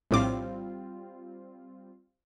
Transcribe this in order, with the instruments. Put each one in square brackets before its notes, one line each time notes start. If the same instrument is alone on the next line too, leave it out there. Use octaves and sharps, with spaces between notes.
[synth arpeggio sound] A#1 A2 D6 [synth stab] G3 C4 F4